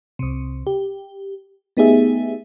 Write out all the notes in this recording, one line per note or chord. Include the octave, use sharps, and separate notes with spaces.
C2 C3
G4
A3 B3 D#4 G4 G#4 E5